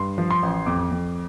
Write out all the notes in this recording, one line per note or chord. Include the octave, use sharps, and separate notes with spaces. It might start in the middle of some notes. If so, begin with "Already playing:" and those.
Already playing: G2 C6
F3
C6
A1
F2 D6
F2